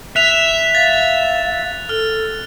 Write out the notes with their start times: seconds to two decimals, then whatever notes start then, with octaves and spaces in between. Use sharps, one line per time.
0.16 E5 F#6 F7
0.75 F5 A6
1.89 A4 F6